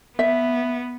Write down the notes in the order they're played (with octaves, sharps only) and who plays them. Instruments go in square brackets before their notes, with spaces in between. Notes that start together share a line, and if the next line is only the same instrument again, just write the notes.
[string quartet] B3 [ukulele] E5